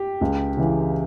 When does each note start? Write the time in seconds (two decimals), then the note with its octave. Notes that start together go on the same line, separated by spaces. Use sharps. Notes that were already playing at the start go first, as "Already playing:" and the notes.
Already playing: G4
0.21 C#2
0.57 C#3 E3